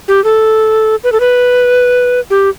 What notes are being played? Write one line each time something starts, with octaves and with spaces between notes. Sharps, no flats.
G4
A4
B4
A4
B4
G4